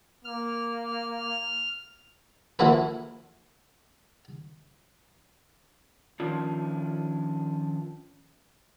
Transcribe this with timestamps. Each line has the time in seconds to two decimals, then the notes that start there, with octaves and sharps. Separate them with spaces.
0.25 A#3 F6
2.59 E3 F3 A#3 F#4 A4 B4
6.20 D#3 F3 C#4 D4 F4